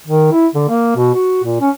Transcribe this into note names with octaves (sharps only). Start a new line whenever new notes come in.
D#3
E4
D3
A#3
B2
F#4
A#2
C#4